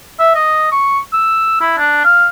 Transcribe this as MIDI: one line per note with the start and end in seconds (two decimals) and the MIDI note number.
0.19 0.33 76
0.35 0.68 75
0.72 0.99 85
1.13 1.60 88
1.61 1.75 64
1.77 2.03 62
2.04 2.28 77